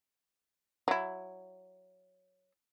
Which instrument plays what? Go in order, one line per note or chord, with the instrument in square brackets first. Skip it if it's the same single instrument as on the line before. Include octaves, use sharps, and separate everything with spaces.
[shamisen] F#3 E4